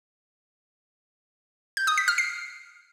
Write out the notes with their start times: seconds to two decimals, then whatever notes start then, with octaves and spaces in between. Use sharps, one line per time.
1.77 G6
1.87 D#6
1.98 B6
2.08 F6
2.18 C7